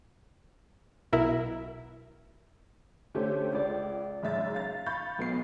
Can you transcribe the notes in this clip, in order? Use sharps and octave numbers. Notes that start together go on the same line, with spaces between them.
B1 B2 E4 A#4 E5
D3 A3 C#4 G4 A4 C5
C#2 D5
F#1 G#2 E5 A6
F5 A6
F5 B5 C#6 G6 A6
B1 B3 C7